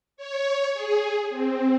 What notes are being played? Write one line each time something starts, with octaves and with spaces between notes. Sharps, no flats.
C#5
G#4
C4